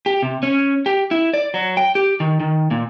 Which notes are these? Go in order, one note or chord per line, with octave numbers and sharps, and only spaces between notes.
G4
C3
C#4
G4
E4
D5
F#3
G5
G4
D#3
D#3
A#2